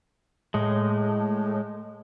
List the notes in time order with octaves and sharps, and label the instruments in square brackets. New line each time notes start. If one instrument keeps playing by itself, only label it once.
[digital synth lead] A2 [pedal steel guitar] G#3